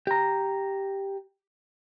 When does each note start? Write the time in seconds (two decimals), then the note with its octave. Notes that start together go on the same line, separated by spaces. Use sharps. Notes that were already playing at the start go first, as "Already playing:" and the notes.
0.07 G4 A#5